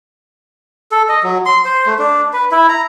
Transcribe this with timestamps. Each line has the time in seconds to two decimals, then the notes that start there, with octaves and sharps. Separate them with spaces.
0.92 A4
1.09 D#5
1.23 F#3
1.46 C6
1.65 C5
1.86 A3
1.99 D4
2.33 B4
2.51 E4
2.69 A#5